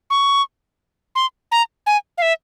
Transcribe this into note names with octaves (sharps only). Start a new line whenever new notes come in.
C#6
C6
A#5
G#5
F5
E5